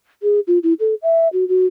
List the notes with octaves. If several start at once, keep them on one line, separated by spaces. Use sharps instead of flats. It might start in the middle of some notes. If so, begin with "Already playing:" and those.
G#4
F4
E4
A4
E5
F#4
F#4